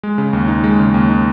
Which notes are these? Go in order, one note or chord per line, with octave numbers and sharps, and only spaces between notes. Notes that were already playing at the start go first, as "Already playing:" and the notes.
G#3
C#3
D#2
D#4
G#3
C#3
D#2
D#4